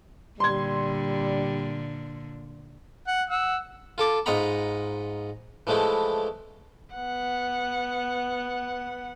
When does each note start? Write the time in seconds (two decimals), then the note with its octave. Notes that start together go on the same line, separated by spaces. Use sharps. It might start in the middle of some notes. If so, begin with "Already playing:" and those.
0.40 A#2 D3 G3 C6 G#6
3.08 F#5
3.30 F#5 E6
3.98 F4 A4 D6
4.26 G#2 F4 D#5 F#5 A#5 B5
5.67 E3 F3 G#3 A3 E4
6.94 B3 F#5